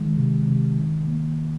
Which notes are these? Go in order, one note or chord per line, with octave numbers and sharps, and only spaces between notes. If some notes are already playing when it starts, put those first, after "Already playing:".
Already playing: D#3 G#3
C3
C3
D#3
A#3